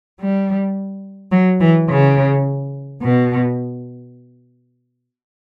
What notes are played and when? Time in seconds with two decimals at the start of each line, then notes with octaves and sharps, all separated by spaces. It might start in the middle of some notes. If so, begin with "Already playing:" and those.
0.20 G3
1.32 F#3
1.60 E3
1.89 C#3
3.02 B2